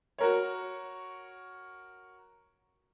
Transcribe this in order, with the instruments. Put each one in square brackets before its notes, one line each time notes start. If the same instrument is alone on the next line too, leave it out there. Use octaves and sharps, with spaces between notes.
[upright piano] F#4 A#4 C#5